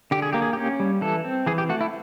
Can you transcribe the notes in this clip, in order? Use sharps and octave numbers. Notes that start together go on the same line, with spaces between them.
D3 G4
G#4
A#3 G4
G#4
C#4 G4
G3
E3 A4
C4
E3 G#4
G4
A3 F#4
E4